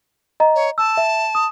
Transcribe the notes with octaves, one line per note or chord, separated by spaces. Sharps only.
D#5 A#5
C#5
A5 E6
E5
D#6